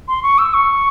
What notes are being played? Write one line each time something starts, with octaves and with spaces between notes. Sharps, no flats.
C6
C#6
E6
C#6